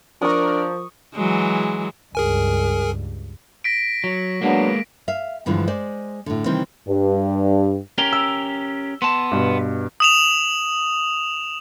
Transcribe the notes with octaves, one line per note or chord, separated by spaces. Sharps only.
F3 D4 A#4 C#6 D#6
E3 F#3 G#3
C#2 G2 G#4 A#4 G#5
A#6 B6 D7
F#3
F#3 G#3 A#3 B3 D4
E5 F5
G2 D3 E3 F3 G#3
G#3 C5 D5
A2 D3
C3 D#3 E3 G3 C4
G2
C#4 G4 A#4 G7
E6
B3 A5 C6
G2 B2
D#6 E7 F7